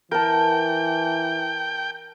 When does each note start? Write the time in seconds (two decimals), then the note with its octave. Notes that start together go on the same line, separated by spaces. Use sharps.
0.12 E3 A#4 G5 A5